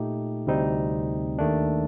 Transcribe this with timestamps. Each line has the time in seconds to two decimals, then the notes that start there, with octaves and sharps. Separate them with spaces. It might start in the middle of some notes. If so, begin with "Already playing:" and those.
Already playing: A#2 A3 D#4 G4
0.47 D2 C3 G3 C4 D#4
1.39 D#2 D#3 A3 D4